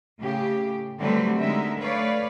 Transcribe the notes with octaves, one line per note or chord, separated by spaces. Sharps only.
A2 C#3 G4
D3 F#3 G3 A3 C4 B4
D3 G#3 D#4 A#4 E5
A3 B4 C#5 D5 F5